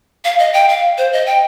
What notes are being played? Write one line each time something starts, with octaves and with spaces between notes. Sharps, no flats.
F5
D#5
G5
F5
C5
D#5
G5